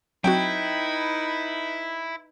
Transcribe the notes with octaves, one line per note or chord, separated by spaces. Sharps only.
F#3 C4 D#4 E4 F#4 B4 G5